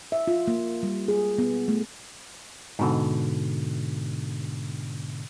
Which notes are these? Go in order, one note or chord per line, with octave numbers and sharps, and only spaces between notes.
E5
F4
A#3
G3
G#4
B3
A3
G#2 B2 D3